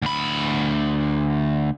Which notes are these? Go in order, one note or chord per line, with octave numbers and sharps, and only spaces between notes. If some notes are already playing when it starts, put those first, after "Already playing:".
D2 B5